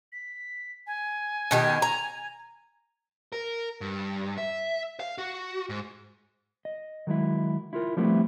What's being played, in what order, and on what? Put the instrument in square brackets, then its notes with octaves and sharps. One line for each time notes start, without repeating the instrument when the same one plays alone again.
[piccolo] B6
G#5
[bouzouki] B2 D#3 G4
A#5
[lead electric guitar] A#4
G2
E5
F5
F#4
G#2
[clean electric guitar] D#5
D#3 F#3 G#3 E4
E4 F4 A#4
F3 G3 A3 B3 C4 E4